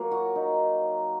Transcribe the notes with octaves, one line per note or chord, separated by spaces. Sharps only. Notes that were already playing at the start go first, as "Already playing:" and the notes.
Already playing: F#3 A#3
F#4
D#4